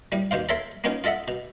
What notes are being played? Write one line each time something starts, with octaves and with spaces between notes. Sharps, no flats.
A2 G3
D#2 B2 C5 F5
A4 A#4 C#5 E5 C6
A#3 B3 C#4 D#4 F4
F4 A4 D#5 E5 F#5
B2